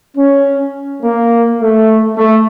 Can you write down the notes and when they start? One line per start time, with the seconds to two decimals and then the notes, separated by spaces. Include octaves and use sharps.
0.16 C#4
1.03 A#3
1.60 A3
2.17 A3